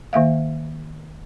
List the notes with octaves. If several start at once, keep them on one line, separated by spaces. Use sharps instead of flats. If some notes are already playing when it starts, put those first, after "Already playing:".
D#3 A#3 E5 F5